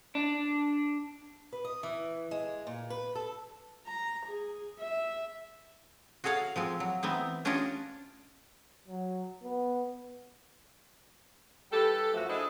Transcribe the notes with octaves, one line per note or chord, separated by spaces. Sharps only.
D4
B4
D#5
E3
G#3
A#2
B4
A4
A#5
G#4
E5
F#4 G#4 A4 C#5 F5 F#5
F3 G#3 C4
F#3
E3 B3 C4 D#4
C#4 D4 F4 G4 C#5 D#5
F#3
B3
E3 G3 G4 A4
F#2 E3 F3 A3 F#4
D4 E4 G#4 A4 C5 D#5